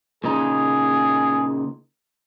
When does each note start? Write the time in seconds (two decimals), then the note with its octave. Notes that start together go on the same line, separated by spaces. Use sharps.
0.24 A#2 C#3 D#4 G#4